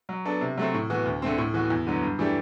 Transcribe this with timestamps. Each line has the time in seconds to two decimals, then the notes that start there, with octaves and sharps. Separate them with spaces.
0.09 F#3
0.25 B3 D4 A4
0.41 C3
0.58 F#3 A3 C4
0.74 A2
0.90 E3 B3 F#4
1.05 D2
1.22 D3 A3 C4
1.38 A2
1.54 E3 B3 F#4 B4
1.70 E2
1.87 D3 F#3 B3
2.03 G2
2.19 E3 A3 D4 G4